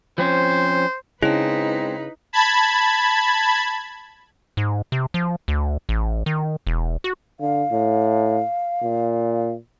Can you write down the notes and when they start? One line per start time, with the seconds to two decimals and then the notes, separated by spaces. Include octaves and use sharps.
0.18 F3 C4 C#4 C5
1.23 C#3 G#3 C4 D#4 E4 B4
2.33 A5 B5 G#6
4.57 G#2
4.92 C3
5.14 F3
5.48 D2
5.89 A1
6.26 D#3
6.67 E1
7.04 F#4
7.40 D3 F5
7.72 A2
8.83 A#2